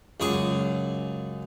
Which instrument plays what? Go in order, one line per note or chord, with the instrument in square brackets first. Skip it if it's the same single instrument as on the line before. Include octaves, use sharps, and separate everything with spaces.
[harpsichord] C#2 F#2 G#4 C#6 D6